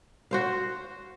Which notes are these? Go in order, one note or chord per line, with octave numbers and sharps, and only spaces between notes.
F#4 C5 F5